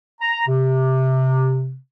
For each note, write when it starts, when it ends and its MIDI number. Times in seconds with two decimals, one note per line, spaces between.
0.21 0.46 82
0.47 1.76 48